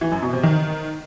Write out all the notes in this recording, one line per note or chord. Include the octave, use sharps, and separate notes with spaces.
E3
F#2
B2
C3
D#3